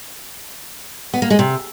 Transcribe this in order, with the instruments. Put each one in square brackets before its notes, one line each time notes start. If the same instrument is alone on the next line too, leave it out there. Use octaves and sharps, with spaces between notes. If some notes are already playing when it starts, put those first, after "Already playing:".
[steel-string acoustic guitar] B3
A#3
G#3
C3